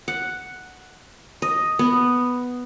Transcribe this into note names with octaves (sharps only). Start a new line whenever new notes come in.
F#5
D#5
B3